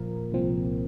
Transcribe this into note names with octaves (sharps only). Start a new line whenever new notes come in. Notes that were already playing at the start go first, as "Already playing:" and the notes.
Already playing: A#2 F3 A#3 A#4
C2 A#2 F3 C4